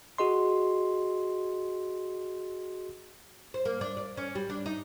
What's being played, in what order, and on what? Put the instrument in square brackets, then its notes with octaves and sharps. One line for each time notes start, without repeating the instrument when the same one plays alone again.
[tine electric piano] F#4 G#4 D#5 C6
[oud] C5
A#3
D4
D5
C#4
G3
D4
D#4